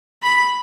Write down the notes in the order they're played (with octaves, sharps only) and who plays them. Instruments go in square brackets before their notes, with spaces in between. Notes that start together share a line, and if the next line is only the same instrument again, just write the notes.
[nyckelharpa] B5